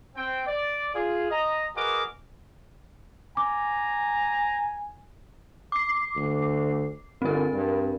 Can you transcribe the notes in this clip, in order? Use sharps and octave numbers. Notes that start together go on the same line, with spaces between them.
C4 G5
D5
F4 G#4
D#5 A#5
F#4 G#4 A#4 B4 D#5 D6
G#5 A#5 D6
D6 C7
D2
G1 C4 A#4
G2